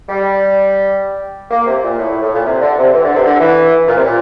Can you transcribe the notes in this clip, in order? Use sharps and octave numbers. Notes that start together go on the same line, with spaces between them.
G3
A#3
C3
A#2
A2
A2
A#2
C3
D3
C3
E3
D3
C3
D3
E3
A#2
C3
A#2